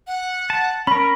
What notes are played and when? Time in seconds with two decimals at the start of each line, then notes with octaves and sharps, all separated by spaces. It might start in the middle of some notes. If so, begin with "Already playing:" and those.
0.07 F#5
0.50 A5
0.87 C#4 A#4 B5